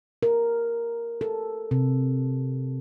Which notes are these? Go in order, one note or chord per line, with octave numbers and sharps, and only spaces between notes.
A#4
A4
C3